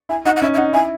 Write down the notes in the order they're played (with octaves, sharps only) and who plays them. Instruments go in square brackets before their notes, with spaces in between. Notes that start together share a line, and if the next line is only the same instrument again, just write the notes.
[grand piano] E4 [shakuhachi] G#5
[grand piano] D#4 [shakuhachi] F#5
[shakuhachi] F#5
[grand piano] C#4 [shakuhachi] E5
[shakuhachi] E5
[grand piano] D#4 [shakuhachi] F#5
[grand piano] E4 [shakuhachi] G#5